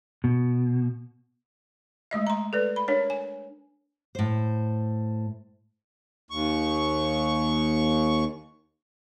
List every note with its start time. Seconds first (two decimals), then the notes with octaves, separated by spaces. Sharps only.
0.24 B2
2.11 G#3 A3 D#5 E5
2.27 A#5 C6
2.53 A4 B4 D5
2.76 B5
2.88 D4 A#4 C#5
3.10 G#5
4.15 A2 C5
6.31 D#2 C#6